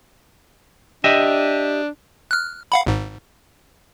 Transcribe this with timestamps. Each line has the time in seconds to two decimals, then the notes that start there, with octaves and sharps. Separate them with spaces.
1.04 D4 G4 D#5 E5
2.31 F6 F#6
2.72 F5 F#5 B5
2.87 G#1 G#2